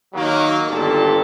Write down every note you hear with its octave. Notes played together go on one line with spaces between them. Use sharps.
D#3 F#3 A#3
G1 G2 A#2 G4 A4 A5